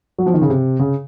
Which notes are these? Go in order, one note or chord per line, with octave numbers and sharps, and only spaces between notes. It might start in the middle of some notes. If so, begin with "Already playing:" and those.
F#3
F3
D#3
C#3
C3
C#3